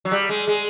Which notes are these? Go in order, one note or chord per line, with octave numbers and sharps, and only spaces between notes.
F#3
G3
G#3
G#3